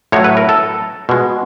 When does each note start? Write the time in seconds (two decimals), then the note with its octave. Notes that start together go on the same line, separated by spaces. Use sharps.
0.12 A2 F#3 A3 C#5
0.24 B4
0.37 A#4
0.49 A4
1.09 B2 G#3